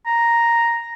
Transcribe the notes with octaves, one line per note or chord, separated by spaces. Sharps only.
A#5